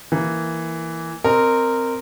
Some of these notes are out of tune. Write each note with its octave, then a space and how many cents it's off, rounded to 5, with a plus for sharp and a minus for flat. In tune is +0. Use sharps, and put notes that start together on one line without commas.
E3 +0 A#3 +0
C4 +0 A#4 -10 D#5 -25